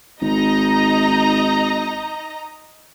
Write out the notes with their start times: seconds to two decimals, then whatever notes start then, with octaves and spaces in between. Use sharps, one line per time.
0.21 G#1 D#4 D#5 A#5